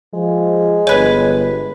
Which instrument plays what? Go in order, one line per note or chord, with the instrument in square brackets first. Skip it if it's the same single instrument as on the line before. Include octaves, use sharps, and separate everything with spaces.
[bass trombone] F3 [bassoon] G#3
[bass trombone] G1 [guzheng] B4 G#5 [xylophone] C#5